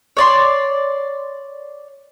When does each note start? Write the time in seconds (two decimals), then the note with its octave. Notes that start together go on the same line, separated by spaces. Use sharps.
0.17 C#5 D5 C6